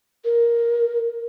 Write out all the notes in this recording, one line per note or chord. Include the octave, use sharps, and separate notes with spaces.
A#4